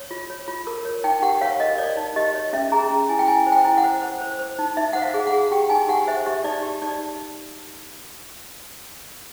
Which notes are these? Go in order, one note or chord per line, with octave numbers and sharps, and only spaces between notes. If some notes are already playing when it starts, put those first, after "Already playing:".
Already playing: C#5
F4
C#5
F4
A#4
C#5
D#4 G5
G4 F#5
C#5 F5
A#4 D#5
C#5 D5
D#4
G4 D#5
C#5
C#4 E5
G#4 A#5
C#4
E4 G#5
G5
E4 G#5
C5
G5
E4
F#5
C5
C5
C5
C5
D#4
D#4 E5
C5 F#5
F5
G#4
F#5
G#4
G4 G5
D#4 G#5
G4 F#5
C5 E5
G4 E5
D#4 D5
G4
D#4 D5